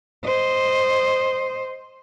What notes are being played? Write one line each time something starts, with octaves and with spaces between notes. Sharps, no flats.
C5 D#5